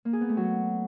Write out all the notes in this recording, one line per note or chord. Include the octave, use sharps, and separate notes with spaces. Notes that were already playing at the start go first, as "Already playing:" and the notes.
A#3
G#4
B3
A3
F#3